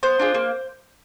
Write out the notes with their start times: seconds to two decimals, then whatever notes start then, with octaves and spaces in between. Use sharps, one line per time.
0.03 B3 C5
0.20 D4 F4 G#4
0.34 A#3